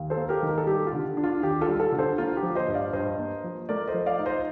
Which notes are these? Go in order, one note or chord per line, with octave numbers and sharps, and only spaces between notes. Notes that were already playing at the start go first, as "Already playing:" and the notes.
Already playing: D#2
A4 C5
A#3
G4 A#4
D#3 A#4
A4
G3 G4
F4
D3
D4
F4
D#2 G4
F4 A4
G3
F4 A4
D3
A4 C5
A#3 F4
G4
F3
C5 D#5
G2
D5 F5
G2 C5 D#5
A#3
F3
A3 A#4 D5
C5 D#5
F3
D5 F5
D#4
C5 D#5